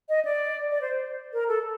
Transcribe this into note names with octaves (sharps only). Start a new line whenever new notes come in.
D#5
D5
D5
C5
A#4
A4